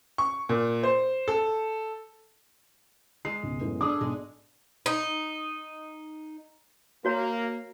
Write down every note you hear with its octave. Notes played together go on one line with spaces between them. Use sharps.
C#6
A#2
C5
A4
G#3 C7
C#2 B2
F#2 A2 B3
D4 G#4 A4 D6 D#6
B1 G#3
D#4
A#3 F#4 C#5 A#5